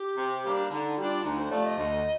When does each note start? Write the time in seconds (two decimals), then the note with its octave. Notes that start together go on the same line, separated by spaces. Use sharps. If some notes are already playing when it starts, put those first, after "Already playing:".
Already playing: G4
0.17 C3
0.44 G3 A#3 D4
0.71 D3 D#4
0.97 G3 D4 F4 G4
1.24 D2 D#4
1.38 C5
1.51 C3 F3 A3 D5
1.65 D#5
1.78 D2